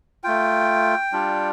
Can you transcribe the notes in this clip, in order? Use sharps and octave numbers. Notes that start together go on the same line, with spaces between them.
A3 F4 G5
G3 D4 F4